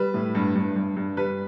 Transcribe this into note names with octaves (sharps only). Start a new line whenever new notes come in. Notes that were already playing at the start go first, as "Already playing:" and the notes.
Already playing: G3 B4
A2
G2
G2
G2
G2
G3 B4